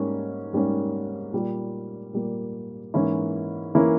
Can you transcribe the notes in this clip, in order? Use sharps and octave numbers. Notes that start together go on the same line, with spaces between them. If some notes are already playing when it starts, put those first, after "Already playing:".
Already playing: G#2 G3 A#3 C#4
G#2 G3 A#3 C#4
A#2 G3 A#3
A#2 G3 A#3
G#2 E3 A#3 C#4 E4
E3 A#3 C#4 E4